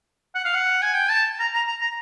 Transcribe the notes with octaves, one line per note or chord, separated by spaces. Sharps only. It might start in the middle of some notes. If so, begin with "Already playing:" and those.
F#5
F5
F#5
G#5
G5
A5
A#5
A#5
A#5
A#5